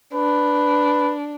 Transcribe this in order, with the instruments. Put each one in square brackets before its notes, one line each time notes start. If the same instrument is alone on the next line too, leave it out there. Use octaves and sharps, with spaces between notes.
[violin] D4 [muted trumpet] B4